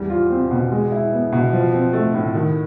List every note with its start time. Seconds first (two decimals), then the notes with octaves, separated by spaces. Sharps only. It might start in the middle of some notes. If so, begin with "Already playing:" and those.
Already playing: E2 E3 G3
0.10 F4
0.30 C4
0.51 B2
0.72 G#3
0.92 E4
1.12 B3
1.32 B2
1.53 F3
1.73 C4
1.93 A3
2.14 A2
2.35 D#3